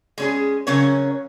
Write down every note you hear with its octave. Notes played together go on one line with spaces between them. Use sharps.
G#3 C#4 G#4
C#3 F#3 C#4 A#4 C#5